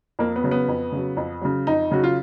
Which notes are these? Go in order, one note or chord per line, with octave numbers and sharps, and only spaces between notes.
F2 A#3
B3
C#3 F#3
B3
F2
C#3 F#3
F2
C#3 F#3
F2 D#4
C#3 F#3 F#4
F4